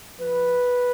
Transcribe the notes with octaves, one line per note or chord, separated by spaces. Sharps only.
F3 B4